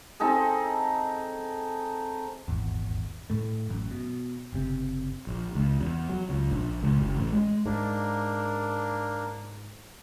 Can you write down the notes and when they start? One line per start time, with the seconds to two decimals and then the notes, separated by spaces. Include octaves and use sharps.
0.20 C4 D#4 G#4 A4
2.48 D#1 G#1 E2
3.30 A2 A3
3.70 A1 F#2
3.91 B2
4.53 F#1 C3
5.27 A#1
5.55 C#2
5.81 E2
6.09 F#3
6.29 C#2
6.51 A#1
6.82 C#2
6.98 F#1
7.17 A1
7.32 G#3
7.66 G#2 A#3 D4